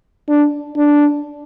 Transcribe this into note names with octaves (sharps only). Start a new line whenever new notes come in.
D4
D4